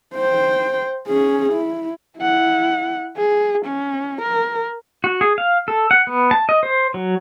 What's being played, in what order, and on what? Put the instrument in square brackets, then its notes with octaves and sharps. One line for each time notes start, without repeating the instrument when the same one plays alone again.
[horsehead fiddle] C5 G5
C#4 G#4
E4
E4 F#5
G#4
C#4
A#4
[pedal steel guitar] F#4
G#4
F5
A4
F#5
B3
A5
D#5
C5
F#3